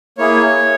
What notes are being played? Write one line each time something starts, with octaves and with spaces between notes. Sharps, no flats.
A#3 E4 G#4 C#5